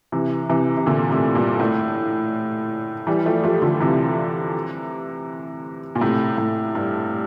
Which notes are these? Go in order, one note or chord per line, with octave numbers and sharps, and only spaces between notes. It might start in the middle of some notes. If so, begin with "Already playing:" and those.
C3 E3
C3 E3
C3
A#2 D3
A2 C3
G2 A#2
A2
E3 G3
F3 A3
F3 A3
D3 F3
C3 E3
A#2
A2 C3
A2
G2